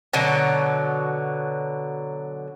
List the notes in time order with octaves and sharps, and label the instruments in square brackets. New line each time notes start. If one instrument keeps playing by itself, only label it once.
[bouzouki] B2 D3 F#3